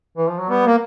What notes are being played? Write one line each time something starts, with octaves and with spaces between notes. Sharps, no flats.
E3
F3
F#3
G3 B3
A#3